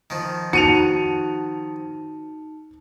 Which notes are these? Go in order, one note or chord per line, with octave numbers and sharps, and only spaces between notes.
D#3 F3
D#4 F#4 A5 C#7 D#7 F7